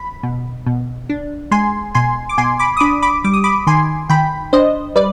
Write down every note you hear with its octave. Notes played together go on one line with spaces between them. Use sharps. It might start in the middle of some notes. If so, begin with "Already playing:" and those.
Already playing: B5
B2
B2
D4
G#3 G#5 C6
B2 G#5 C6
D6
B2 G#5 C6
B5 D6
D#6
D4 B5 D6
B5 D6
G3 D6
D#6
B5 D6
D#3 G#5 C6
D#3 G5 B5
D4 C5 D#5
G3 B4 D5